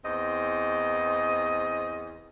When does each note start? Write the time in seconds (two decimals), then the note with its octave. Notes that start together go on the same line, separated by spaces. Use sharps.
0.05 E2 C4 D#5